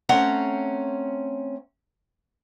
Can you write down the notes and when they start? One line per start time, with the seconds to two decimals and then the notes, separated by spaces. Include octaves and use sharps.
0.09 A3 C4 C#4 F#5 A#5